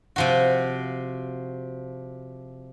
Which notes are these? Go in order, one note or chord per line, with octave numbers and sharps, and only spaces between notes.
C3 F3 F#4